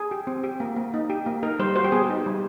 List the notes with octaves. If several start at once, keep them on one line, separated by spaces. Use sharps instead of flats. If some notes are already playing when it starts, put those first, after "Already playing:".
Already playing: G#4
G4
C4
G4
A#3
A#3
D#4
G4
A#3
D#4 A#4
G3 C5
F#4 C5
G4
B3 G#4
D#4
G3